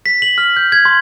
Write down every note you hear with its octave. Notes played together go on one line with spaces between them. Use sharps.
B6
F#7
F6
G6
G#6
C6